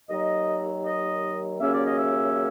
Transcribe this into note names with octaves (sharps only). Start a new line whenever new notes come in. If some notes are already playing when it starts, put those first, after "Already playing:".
D#2 D#3 F#3 D#5
D#5
D#2 C#3 F#3 A#3 C#4 E5
D5
D#5
E5